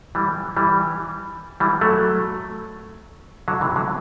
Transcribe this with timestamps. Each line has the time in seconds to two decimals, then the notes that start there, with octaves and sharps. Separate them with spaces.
0.15 E3 G3
0.56 E3 G3
1.60 E3 G3
1.81 F#3 A3
3.48 D3 F#3
3.61 C3 E3
3.76 D3 F#3